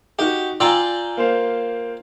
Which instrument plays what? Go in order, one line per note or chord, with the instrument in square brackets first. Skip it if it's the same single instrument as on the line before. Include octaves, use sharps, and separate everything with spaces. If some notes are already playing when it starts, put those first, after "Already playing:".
[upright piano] D#4 F#4 [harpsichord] G4
[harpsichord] F4 D5 G5 [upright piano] G#5 A#5 E6
[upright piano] A#3 C5 F5